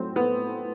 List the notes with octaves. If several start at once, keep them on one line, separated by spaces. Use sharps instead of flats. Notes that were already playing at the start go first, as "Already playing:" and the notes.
Already playing: A2 F#3 C4
A3 B3